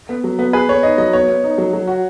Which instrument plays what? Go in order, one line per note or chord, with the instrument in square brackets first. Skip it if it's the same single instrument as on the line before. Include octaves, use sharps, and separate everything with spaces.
[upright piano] B3
F#3
B3
[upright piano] G#4 [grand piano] B4
[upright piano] B3 [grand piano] C#5
[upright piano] D#4 [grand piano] D#5
[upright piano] F#3 [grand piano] D#5
[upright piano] B3 [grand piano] C#5
[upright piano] B3
D#4
F#3
F#3
F#4